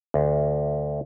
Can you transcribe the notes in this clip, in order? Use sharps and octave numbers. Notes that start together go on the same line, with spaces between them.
D2